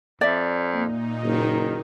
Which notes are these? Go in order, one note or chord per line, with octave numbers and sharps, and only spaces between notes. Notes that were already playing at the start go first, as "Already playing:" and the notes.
F2 D5 E5
A#2 A#3 D#4
F#1 D#3